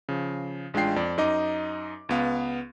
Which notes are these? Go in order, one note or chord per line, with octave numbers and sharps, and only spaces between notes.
C#3 F3
A1 G#3 D4 F4 G5 C7
F2 D5
F#2 D#4 D#5 D6
C#2 B3 F5